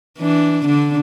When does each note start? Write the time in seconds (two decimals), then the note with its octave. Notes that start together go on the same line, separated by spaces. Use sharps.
0.19 E3 D4
0.65 D3 D4